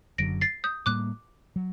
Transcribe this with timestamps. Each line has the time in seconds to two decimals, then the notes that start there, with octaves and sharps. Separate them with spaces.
0.18 F#1 F#2 D3 F#3 A#6 D7
0.41 A6 C7
0.64 D#6 G6
0.86 A2 G3 A#3 D6 F#6
1.56 F#3